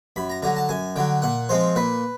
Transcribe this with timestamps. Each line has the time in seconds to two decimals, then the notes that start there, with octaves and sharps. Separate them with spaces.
0.16 F#2 B5
0.30 A#5
0.43 D3 F#3 A#5
0.56 A5
0.69 F#2 G#5
0.96 D3 F#3 G5
1.22 A#2 F#5
1.49 F3 G#3 C4 C5
1.76 A#2 B4